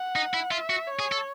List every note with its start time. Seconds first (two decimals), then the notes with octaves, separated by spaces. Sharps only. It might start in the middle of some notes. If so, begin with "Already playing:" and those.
Already playing: F#5
0.16 D#4
0.34 E4
0.51 F4 E5
0.70 F#4
0.87 C#5
0.99 G#4
1.12 A4